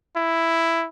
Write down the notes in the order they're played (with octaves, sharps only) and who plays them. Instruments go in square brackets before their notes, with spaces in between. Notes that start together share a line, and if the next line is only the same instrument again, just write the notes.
[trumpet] E4